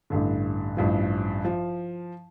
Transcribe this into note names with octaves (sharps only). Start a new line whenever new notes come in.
A1 G2 D3
A1 G2 F3
F3